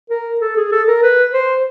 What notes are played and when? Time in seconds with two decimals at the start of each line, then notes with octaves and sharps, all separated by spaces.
0.10 A#4
0.41 A4
0.56 G#4
0.72 A4
0.88 A#4
1.03 B4
1.34 C5